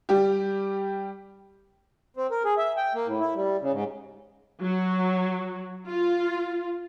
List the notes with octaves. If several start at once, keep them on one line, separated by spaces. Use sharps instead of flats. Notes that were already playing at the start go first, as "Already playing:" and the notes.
G3 G4
C4
A#4
G#4
E5
G5
A#3
A2
E4
G3
C#3
G#2
F#3
F4